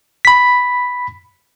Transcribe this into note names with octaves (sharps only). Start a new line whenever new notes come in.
B5 B6